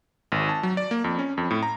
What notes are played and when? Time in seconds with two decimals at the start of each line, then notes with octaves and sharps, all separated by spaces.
0.32 G#1
0.49 A5
0.63 F#3
0.77 D5
0.91 A#3
1.04 F2
1.19 C#4
1.37 F2
1.50 A2
1.63 A#5